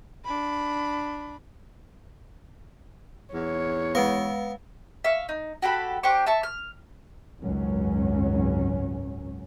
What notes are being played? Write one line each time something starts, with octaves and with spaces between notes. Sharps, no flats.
D4 B5
E2 C#5
G#3 B3 B4 F5
E5 F5 C#6
D#4
F#4 G4 A4 B5
D4 G4 C5 C#6
E5 A5 C#6
F6
G#1 C#2 F#2 F#3 C#4